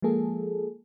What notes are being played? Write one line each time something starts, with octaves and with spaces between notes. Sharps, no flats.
F3 G#3 A#3 G#4 A4